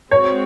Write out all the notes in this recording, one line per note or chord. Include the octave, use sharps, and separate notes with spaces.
G#3 C4 F#4 C#5